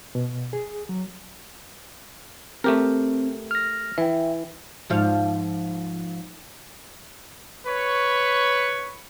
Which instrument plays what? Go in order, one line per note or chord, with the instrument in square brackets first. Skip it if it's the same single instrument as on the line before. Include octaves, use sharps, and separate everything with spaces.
[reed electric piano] B2
G#4
F#3
[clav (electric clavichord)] A3 G4 A#4 [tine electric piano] C4
[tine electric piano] F6 A#6
[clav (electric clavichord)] E3 [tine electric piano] E5 G5
[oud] G#2 F3 F5
[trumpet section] B4 C#5 C#6